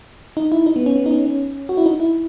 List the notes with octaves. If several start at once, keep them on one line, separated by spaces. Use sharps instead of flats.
D#4
E4
D#4
B3
C#4
B3
D#4
C#4
C#4
F#4
E4
D#4
E4